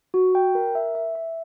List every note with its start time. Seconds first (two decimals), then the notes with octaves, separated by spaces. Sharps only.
0.14 F#4
0.35 G5
0.55 A#4
0.75 E5
0.95 E5
1.15 E5